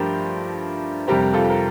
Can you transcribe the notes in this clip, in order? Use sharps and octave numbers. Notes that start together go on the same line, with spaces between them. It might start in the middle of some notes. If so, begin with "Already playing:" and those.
Already playing: G2 F3 A3 D4 G4 A#4 C5
F2 C3 G3 C4 G4 A#4
F4 A4
A#4